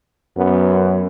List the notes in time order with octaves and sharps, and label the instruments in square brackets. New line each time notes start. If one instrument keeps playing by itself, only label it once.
[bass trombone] F#2 [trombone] B3